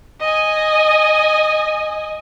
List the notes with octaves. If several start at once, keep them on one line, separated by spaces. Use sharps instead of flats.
D#5 G#5